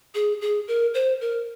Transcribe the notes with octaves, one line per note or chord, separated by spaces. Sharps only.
G#4
G#4
A#4
C5
A#4